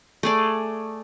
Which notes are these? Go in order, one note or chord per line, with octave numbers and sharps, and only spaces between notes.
A3 G#4 D5